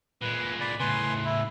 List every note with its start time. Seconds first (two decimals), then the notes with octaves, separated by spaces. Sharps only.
0.22 A#2 G#3 B4
0.61 D5 B5
0.80 A2 C#3 B4 G#5 C6
1.25 E4